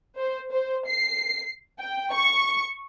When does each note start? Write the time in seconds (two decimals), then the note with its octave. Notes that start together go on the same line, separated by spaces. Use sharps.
0.18 C5
0.52 C5
0.88 C7
1.80 G5
2.13 C#6